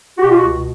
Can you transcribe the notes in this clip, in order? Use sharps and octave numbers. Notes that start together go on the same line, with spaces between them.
F#4
B2 G4
F4
C#2 F#4
B2